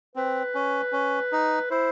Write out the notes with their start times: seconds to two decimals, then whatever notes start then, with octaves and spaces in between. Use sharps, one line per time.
0.16 C4 B4
0.54 C#4
0.92 C#4
1.32 D#4
1.70 E4 C5